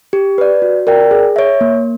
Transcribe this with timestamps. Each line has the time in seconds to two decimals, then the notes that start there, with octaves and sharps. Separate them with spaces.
0.13 G4
0.38 B4 D5
0.62 F#4
0.87 A#4 D5 G5
1.11 G#4
1.36 C#5 E5
1.61 A#3